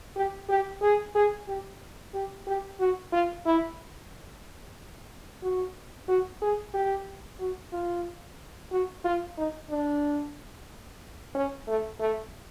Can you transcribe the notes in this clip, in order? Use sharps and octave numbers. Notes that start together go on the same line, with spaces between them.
G4
G4
G#4
G#4
G4
G4
G4
F#4
F4
E4
F#4
F#4
G#4
G4
F#4
F4
F#4
F4
D#4
D4
C#4
A3
A3